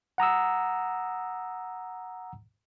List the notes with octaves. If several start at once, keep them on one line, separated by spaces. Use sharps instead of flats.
F#5 A#5 D#6 E6